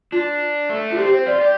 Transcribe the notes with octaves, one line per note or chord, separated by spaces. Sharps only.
D4 F4
A3
D4 F4
C4 G4
C5
F4 D5
G4